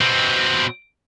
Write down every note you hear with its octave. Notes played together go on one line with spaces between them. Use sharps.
B2 C4